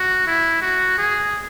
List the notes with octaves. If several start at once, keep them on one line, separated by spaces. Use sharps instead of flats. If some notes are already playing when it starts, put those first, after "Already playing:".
Already playing: F#4
E4
F#4
G#4